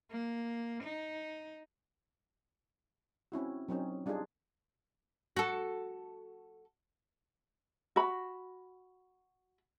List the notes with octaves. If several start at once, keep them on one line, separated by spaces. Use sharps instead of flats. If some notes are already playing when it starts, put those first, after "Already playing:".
A#3
D#4
C4 C#4 E4 F#4
F#3 C4 C#4 D#4
G3 D4 D#4 F4 G#4
F#4 A4
F#4 B5